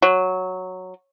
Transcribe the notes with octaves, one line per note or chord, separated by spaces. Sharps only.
F#3